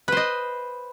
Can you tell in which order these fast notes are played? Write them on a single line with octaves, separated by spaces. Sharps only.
B4 C5 D#5